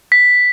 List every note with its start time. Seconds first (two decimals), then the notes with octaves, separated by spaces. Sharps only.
0.12 B6